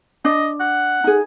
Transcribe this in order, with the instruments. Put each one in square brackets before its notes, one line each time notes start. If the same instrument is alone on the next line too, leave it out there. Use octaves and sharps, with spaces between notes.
[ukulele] D4 [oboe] D#5
[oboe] F#5
[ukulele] D#4 G#4